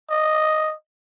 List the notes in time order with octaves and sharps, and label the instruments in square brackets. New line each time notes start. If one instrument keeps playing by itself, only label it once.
[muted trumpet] D#5